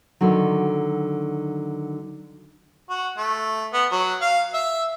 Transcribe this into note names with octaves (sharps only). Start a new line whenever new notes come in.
D3 D#3 F#3
F#4
A3
B3
F#3
F5
E5